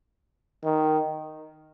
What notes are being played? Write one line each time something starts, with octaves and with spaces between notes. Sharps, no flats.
D#3